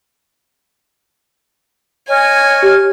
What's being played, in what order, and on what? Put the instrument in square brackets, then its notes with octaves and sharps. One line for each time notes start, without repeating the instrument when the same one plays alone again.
[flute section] C#5 D#5 F6 [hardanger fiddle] G#5
[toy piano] G4